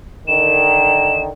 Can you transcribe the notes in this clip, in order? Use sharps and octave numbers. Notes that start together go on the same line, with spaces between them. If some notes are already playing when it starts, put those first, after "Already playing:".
D3 D#3 E7